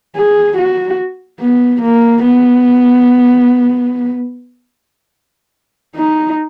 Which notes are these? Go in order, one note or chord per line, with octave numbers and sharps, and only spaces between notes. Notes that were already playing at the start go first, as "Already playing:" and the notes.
G#4
F#4
B3
A#3
B3
D#4